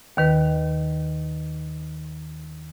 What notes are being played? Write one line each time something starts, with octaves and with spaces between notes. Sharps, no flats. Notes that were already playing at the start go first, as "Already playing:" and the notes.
D#2 D#3 B4